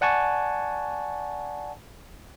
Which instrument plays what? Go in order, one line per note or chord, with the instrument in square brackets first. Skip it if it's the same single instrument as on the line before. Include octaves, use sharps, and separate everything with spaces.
[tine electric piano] D5 F#5 G#5 A5 C#6